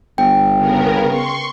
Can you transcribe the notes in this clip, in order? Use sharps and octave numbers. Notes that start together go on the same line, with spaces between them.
G1 G5
C#3 B3 A#4
C6 C#6